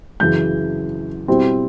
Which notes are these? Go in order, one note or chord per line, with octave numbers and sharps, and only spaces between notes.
F#2 C#3 E3 G6
B2 G3 C4 E4